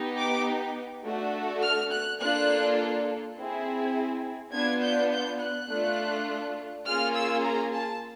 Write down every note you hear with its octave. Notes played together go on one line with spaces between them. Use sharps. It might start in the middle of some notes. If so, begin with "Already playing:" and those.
Already playing: B3 D#4 G4
D6
A3 D4 F#4 A4
F6
F#6
A#3 D4 F4 A4 F#6
C4 E4 G#4
B3 D4 F4 G#6
G6
G6
F#6
A3 D4 F4
A#3 C#4 F4 G#4 F6
E6
A#5
A5